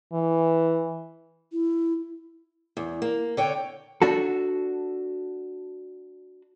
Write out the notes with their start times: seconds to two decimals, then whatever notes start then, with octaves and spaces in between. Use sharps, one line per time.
0.13 E3
1.51 E4
2.77 E2
3.02 A#3
3.37 D3 C#5 G5
4.02 D4 F#4 A4